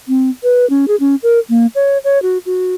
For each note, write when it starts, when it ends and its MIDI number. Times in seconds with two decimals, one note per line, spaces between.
0.08 0.30 60
0.43 0.68 71
0.70 0.85 61
0.88 0.96 68
1.00 1.16 61
1.23 1.39 70
1.50 1.67 58
1.75 1.98 73
2.04 2.21 73
2.22 2.38 66
2.46 2.75 66